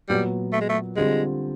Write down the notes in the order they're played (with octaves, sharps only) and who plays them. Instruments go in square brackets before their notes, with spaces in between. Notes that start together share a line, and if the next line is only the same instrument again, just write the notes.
[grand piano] A#2 F#3 B3 [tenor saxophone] G3
[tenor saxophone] A3
G#3
A3
[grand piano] D3 G3 C4 F4 [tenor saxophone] G#3